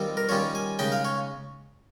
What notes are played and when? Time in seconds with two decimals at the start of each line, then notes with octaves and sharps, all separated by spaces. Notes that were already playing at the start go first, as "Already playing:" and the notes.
Already playing: D#3 G3 C4 F4
0.17 A#4
0.29 D#3 G3 C#4 F4 C#5
0.55 G#5
0.79 C#3 G#3 D#4 G5
0.92 F5
1.05 C#5